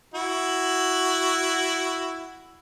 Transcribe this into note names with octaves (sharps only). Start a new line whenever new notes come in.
E4 F#4